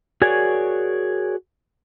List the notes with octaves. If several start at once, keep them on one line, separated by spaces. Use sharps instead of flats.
F#4 G#4 A#4 C#5 D5 G#5